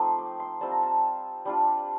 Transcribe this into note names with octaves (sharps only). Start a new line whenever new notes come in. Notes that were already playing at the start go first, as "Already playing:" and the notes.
Already playing: F3 A3 C4 D#4 C6
D6
C6
G3 C4 F4 A5
A#5
A5
G3 D4 F4